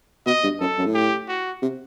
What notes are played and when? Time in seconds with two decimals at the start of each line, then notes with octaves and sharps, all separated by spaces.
0.26 B2 D#5
0.44 G2
0.60 F#2 A4
0.78 F#2
0.86 A2
0.94 G4
1.28 F#4
1.62 C3